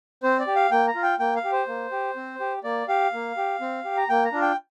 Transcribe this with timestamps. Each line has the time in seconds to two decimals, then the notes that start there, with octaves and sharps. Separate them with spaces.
0.23 C4 C5
0.39 D5
0.47 G4
0.56 F5
0.71 A#3 G5
0.87 A#5
0.95 F4
1.03 G5
1.19 A#3 G5
1.36 F5
1.44 G4
1.52 C5
1.68 A#3
1.91 G4
2.16 C4
2.40 G4
2.64 A#3 D5
2.88 G4 F5
3.13 A#3
3.37 G4
3.61 C4
3.84 G4
3.97 A#5
4.09 A#3 G5
4.25 A#5
4.32 D4 F4
4.42 G5